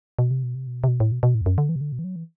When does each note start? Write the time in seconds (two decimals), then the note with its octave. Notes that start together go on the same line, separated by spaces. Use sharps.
0.19 B2
0.31 C3
0.43 B2
0.55 C3
0.67 B2
0.84 C3
0.88 B2
1.00 A2
1.12 B2
1.23 B2
1.35 A2
1.41 E2
1.46 F#2
1.58 D3
1.69 E3
1.76 C3
1.81 D3
1.92 B2
1.99 E3
2.04 F#3
2.16 E3